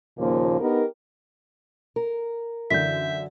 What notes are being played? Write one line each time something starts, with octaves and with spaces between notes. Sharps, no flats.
D#2 A#2 C#3 F3 A#3
B3 D#4 G4 A#4
A#4
F#2 D3 E3 E5 G6 B6